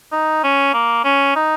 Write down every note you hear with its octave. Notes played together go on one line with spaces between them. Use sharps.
D#4
C#4
A#3
C#4
D#4